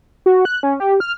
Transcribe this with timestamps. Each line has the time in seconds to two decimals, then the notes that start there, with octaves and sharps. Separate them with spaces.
0.26 F#4
0.45 F#6
0.63 C#4
0.80 G4
1.00 F6